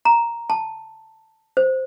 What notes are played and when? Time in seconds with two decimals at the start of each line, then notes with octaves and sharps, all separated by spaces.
0.05 A#5
0.50 A5
1.57 C5